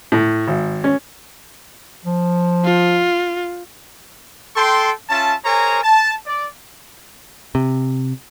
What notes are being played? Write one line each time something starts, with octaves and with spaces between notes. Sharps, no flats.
A2
G#1
C#4
F3
F4
A4 G5 C6
C#4 F4 E5 A5
G#4 A#4 C5 C#5 G#5 A#5
A5
D5
C3